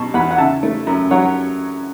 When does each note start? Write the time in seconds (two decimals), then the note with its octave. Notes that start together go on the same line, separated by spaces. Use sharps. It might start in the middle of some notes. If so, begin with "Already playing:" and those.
Already playing: B2 F#3 A5 C#6
0.14 E2 F#5 B5
0.31 F#5
0.38 C#3 E5 A5
0.63 A3
0.87 F#2
1.11 F#3 C#5 F#5